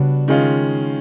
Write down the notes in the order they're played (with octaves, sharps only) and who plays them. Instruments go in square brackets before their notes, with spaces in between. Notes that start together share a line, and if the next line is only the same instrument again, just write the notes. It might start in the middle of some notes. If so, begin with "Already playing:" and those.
Already playing: [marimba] C#3 [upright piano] G3 B3 D4 F#4
[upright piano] D#3 G#3 C#4 F4